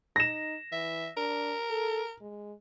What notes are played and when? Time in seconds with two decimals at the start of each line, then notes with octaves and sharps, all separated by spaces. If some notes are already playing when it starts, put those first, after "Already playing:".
0.16 D#4 A#6 E7
0.72 E3 E5
1.17 D4 A#4
1.70 A4
2.21 G#3